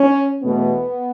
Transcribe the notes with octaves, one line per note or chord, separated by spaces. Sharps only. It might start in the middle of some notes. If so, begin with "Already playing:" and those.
Already playing: C#4
E2 B2 A3 B3